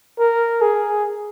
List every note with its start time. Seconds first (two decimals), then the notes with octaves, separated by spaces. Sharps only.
0.19 A#4
0.61 G#4